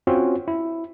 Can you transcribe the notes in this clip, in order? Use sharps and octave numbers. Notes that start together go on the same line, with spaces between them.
C4 C#4 F4 F#4
E4